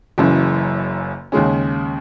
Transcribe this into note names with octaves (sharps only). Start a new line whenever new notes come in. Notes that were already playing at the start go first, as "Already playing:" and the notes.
F#1 F#2 C#3 E3
D#2 C#3 G#3 C#4